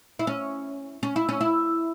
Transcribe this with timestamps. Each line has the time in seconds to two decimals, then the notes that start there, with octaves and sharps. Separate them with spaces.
0.19 E4
0.27 C#4
1.03 C#4
1.16 E4
1.29 C#4
1.41 E4